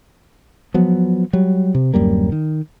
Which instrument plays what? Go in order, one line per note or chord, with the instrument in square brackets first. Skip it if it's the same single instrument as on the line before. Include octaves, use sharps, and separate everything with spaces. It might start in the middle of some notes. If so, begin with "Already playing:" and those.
[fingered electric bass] F3 F#3 B3
F#3 G3
C3
D1 F#2 G3 A#3
D#3